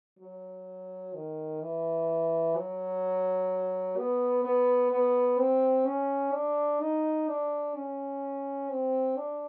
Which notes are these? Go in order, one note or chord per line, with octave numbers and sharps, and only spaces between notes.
F#3
D#3
E3
F#3
B3
B3
B3
C4
C#4
D4
D#4
D4
C#4
C4
D4